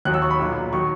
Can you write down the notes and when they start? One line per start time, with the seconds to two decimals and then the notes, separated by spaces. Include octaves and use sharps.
0.05 D#2 D#3 F#3 F#6
0.14 E6
0.22 C#6
0.30 B5
0.39 B1 A#2 F#3
0.73 D#3 F#3 C#6